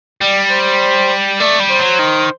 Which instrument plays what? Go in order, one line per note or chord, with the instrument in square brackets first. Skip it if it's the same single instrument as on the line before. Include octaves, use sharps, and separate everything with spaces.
[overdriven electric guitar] G3 [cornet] D5
[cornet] C5
[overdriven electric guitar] A3 [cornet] D5
[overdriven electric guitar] G3
[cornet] C5
[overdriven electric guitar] F#3
D#3